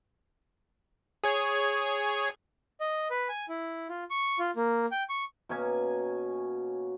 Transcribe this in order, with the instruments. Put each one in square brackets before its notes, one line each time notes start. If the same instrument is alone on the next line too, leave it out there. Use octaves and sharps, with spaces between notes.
[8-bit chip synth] G#4 C#5 G#6
[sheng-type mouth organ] D#5
B4
G#5
E4
F4
C#6
F4
A#3
G5
C#6
[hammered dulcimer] B2 A#3 C#4 G#5